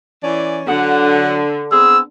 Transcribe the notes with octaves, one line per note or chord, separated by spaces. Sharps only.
E3 C#4 D5
D3 F#3 F#5
B3 C4 G#4 E6